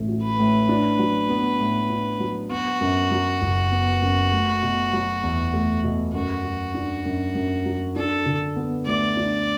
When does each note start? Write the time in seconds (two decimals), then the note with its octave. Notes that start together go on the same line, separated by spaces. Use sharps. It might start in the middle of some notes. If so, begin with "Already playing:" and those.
Already playing: A1 A2 A3
0.08 F#4
0.23 B4
0.39 A2
0.69 D4
0.99 F#3
1.29 B3
1.60 A2
1.90 D4
2.20 F#3
2.51 B3 F#4
2.81 F#2
3.11 F#3
3.42 F#1
3.72 B3
4.02 F#2
4.32 A3
4.63 B2
4.93 F#3
5.23 E2
5.54 A3
5.84 B2
6.14 F#2 F#4
6.44 F#3
6.74 D4
7.05 F#2
7.35 F#2
7.66 F#3
7.96 D4 A4
8.26 D3
8.56 B3
8.87 D2 D5
9.17 D4